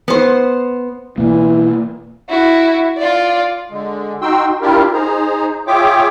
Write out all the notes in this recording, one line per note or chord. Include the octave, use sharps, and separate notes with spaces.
B3 C5
B2 E3 A#3
E4 F#4
F4 D5
D3 G#3
D#4 F#4 G5 C6 E6
D4 E4 F4 G4 A#4
D#4 G#4 C5 A#5
F4 G#4 C#5 E5 G5 D6